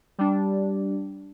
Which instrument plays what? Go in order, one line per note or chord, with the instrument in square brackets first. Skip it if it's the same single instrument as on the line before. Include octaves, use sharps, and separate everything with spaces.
[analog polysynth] G3 D4